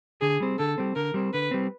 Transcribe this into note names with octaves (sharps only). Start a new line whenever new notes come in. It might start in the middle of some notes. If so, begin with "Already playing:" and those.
D3 G#4
G3 C4
D3 A4
G3 C4
D3 A#4
G3 C4
D3 B4
G3 C4